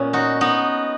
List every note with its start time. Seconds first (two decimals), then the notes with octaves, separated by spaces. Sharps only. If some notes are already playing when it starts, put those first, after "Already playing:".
Already playing: A#2 B3 C#4
0.13 D#4 F#4
0.41 B3 D#4